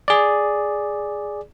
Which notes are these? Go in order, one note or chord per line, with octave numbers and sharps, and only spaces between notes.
G#4 D5